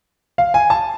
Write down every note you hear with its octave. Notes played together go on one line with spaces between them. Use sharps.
F5
G#5
A5